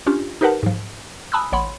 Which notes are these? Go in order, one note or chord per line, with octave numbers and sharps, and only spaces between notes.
C#4 D4 F4 G4
D#4 G4 A#4 B4 F#5 A5
G#2 F3
G#5 A5 B5 D#6 E6 F#6
A1 C#5 F#5 B5 C6